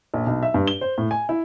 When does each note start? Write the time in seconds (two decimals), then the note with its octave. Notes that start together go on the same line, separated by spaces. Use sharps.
0.14 A#1
0.26 B1
0.43 E5
0.54 G2
0.68 G7
0.81 C5
0.98 A2
1.11 G#5
1.29 E4